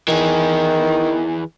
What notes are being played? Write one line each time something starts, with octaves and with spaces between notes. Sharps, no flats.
D#3 E3 G#4